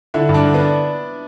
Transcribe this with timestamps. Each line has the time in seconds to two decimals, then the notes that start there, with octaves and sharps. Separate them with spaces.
0.14 D3 E4
0.29 G2
0.34 D4
0.45 D3
0.54 B3
0.60 D4